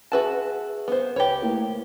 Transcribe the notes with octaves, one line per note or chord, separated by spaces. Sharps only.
F#4 G#4 B4 E5 F#5 A5
B3 C5
C#2 G4 B4 C#5
A3 A#3 E4